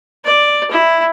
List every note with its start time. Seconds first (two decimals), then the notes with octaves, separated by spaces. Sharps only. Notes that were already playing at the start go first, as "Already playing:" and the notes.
0.25 D5
0.71 E4